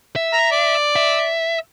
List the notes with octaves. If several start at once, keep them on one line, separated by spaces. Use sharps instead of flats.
E5
A#5
D5
E5